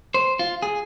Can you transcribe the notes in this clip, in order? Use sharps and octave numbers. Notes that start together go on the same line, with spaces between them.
C5
F4
G#4